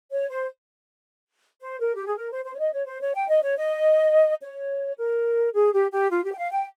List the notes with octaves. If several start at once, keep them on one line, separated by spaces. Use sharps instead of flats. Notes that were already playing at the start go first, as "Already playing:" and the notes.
C#5
C5
C5
A#4
G4
G#4
A#4
C5
C5
C#5
D#5
C#5
C5
C#5
G5
D#5
C#5
D#5
C#5
A#4
G#4
G4
G4
F4
G4
G5
F5
G5